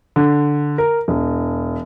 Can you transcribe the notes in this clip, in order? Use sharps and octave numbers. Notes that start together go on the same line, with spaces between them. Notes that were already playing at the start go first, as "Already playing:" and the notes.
D3
A#4
E1